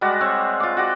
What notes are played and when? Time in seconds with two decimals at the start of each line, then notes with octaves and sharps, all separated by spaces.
0.01 G3 G#3 F#4 D5
0.21 C4 C#5 C#6
0.60 F4 D6
0.77 F#4 D5 G5